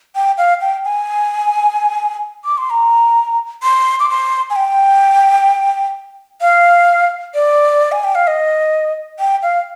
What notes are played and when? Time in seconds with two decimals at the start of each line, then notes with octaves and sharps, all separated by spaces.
0.15 G5
0.38 F5
0.61 G5
0.85 G#5
2.45 D6
2.58 C6
2.70 A#5
3.63 C6
4.00 D6
4.09 C6
4.50 G#5
4.56 G5
6.41 F5
7.34 D5
7.92 G#5
8.04 G5
8.15 F5
8.27 D#5
9.20 G5
9.43 F5